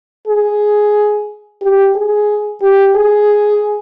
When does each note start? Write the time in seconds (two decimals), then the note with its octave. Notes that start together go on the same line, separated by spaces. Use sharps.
0.27 G#4
1.61 G4
1.95 G#4
2.62 G4
2.95 G#4